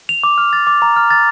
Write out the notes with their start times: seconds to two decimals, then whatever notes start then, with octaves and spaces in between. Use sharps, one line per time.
0.09 F7
0.23 D6
0.38 F6
0.53 A6
0.67 D6
0.82 A#5
0.96 F6
1.11 A6